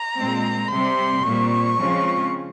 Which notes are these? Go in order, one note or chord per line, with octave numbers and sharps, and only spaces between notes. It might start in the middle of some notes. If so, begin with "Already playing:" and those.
Already playing: A#5
A#2 G#3 C4
C3 G3 C4 C6
A#2 G3 C4 C#6
C#3 F3 G#3 C4 F4